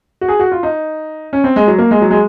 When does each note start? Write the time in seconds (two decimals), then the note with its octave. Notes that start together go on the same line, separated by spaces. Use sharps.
0.21 F#4
0.28 G#4
0.40 F#4
0.52 F4
0.63 D#4
1.33 C#4
1.44 C4
1.56 G#3
1.68 F#3
1.78 A#3
1.91 G#3
2.02 F#3
2.11 G#3